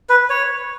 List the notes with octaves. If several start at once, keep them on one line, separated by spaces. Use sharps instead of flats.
B4
C#5